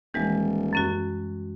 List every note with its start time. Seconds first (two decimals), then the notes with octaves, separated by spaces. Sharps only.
0.14 D#1 E3 G3 G#3
0.73 F#2 C#4 F#4